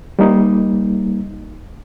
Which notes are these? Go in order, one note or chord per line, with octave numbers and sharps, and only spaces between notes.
G3 A#3 D#4